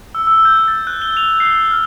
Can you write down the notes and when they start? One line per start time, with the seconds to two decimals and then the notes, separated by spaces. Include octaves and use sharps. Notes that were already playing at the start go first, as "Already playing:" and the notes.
0.15 E6
0.27 E6
0.45 G6
0.68 A6
0.87 F#6
1.02 G7
1.17 F7
1.40 C7
1.71 F6